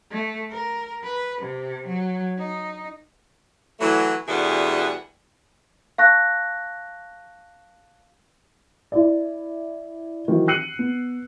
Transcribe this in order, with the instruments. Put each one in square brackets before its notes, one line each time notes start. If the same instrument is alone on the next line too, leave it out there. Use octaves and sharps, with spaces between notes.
[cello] A3
A#4
B4
C3
F#3
D#4
[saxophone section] E3 F#3 A3
D2 B2 E3 G3 G#4 F#5
[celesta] F5 A5 C#6 F#6 A#6
[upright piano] E4 D5
D#3 E3 F#3 C4
E6 F#6 C7 C#7 D#7 F#7
B3